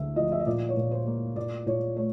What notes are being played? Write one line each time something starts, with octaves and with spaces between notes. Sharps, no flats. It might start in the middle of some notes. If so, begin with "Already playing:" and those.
Already playing: D2 A3 E5
F3 D#5
E5
D#5
A#2 D5
C#5
A#2
C5
A#3
A#2 D5
A#2 C#5
A3 C#5